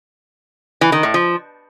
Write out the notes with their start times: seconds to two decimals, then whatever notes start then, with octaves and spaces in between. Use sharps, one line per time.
0.81 E3
0.92 D#3
1.03 A2
1.14 F3